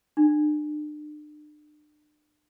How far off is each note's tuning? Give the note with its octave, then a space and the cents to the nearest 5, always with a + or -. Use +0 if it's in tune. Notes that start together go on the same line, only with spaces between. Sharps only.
D4 +40